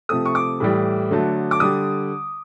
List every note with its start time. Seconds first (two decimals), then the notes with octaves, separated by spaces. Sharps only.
0.09 C3 F3 A3 D#6
0.25 C#6
0.35 D6
0.60 A2 E3 G3
1.11 D3 F#3 A3
1.51 D6
1.60 D3 G3 D#6